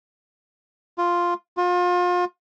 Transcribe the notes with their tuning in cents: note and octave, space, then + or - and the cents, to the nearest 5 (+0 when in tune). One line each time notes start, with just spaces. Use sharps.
F4 +0
F4 +35